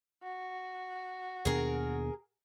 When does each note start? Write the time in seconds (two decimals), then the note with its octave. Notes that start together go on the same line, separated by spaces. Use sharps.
0.23 F#4
1.45 D#2 B2 D4 G#4 A#4